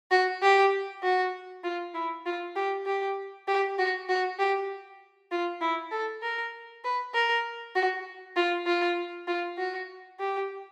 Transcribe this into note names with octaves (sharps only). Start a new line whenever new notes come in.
F#4
G4
F#4
F4
E4
F4
G4
G4
G4
F#4
F#4
G4
F4
E4
A4
A#4
B4
A#4
F#4
F4
F4
F4
F#4
G4